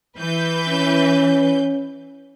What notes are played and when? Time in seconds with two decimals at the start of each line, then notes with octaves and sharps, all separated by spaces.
0.18 E3 B4 G6
0.68 C#4